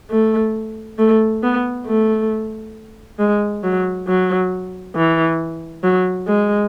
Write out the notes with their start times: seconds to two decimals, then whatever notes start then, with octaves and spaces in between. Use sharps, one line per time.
0.10 A3
0.98 A3
1.43 B3
1.86 A3
3.19 G#3
3.63 F#3
4.07 F#3
4.96 E3
5.83 F#3
6.27 G#3